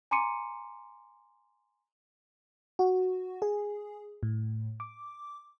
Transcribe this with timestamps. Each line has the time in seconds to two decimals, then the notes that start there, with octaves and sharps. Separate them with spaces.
0.11 G#5 A#5 C6 D6 C#7 D#7
2.79 F#4
3.42 G#4
4.23 A2
4.80 D6